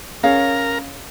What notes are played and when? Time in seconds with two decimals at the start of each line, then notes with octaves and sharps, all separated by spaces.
0.23 C#4 G#4 A#4 C#5 F5 A#5